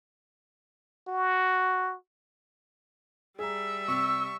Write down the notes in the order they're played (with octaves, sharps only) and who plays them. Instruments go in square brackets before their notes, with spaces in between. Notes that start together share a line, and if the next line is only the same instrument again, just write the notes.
[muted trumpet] F#4
[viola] G3 E5 [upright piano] G#4 A#5
[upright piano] C3 [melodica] C#6 [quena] E6